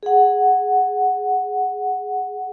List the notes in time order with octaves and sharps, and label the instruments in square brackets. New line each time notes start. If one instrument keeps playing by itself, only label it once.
[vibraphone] G#4 F#5